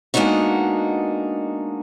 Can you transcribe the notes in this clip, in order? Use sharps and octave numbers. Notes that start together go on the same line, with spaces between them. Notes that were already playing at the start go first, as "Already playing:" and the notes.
G#3 A#3 B3 D4 D#4 F#4